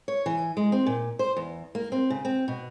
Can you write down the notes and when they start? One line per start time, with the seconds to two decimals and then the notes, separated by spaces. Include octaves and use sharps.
0.08 C#5
0.26 E3
0.57 G#3
0.72 C4
0.86 A#2
1.19 C5
1.37 E2
1.75 A#3
1.92 C4
2.10 C#3
2.25 C4
2.48 B2